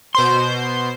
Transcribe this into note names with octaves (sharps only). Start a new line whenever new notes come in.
B2 C5 C6 G6